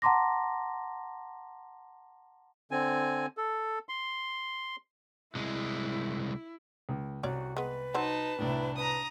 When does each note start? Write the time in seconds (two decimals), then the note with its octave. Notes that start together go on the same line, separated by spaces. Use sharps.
0.02 F#5 A5 A#5 C6 D6 A#6
2.71 D3 C4 G#5
3.37 A4
3.89 C6
5.35 C2 G#3 E4
6.89 C#2
7.23 C2 C#4 F#4 C#5 D5
7.57 G#3 B3 B4
7.94 F#3 D#4 C5 A5
8.38 C2 A2 D4 E4
8.77 B4 A#5 D#6